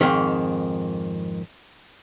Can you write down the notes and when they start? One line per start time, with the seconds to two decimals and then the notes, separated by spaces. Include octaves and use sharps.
0.01 F2 G#2 D#3